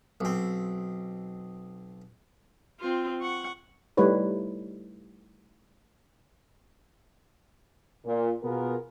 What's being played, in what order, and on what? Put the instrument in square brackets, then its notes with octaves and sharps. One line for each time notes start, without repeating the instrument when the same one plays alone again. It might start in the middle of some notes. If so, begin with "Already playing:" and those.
[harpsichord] B1 C4
[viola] C4 F4
F#5 C#6
[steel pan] G3 A3 D#4 E4 B4 C#5
[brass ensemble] A#2
B2 B3 F4 G#4 A#4